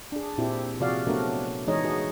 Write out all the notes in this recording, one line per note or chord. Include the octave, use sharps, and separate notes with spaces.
D4 G#4
A#2 C4 E4 G4
C3 F3 F#4 G#4 D5 F5
F#3 A3 B3 D4 F#4 A#4
E3 G#3 D#4 G#4 C#5 D#5
D#4 F#4 G#4 D#5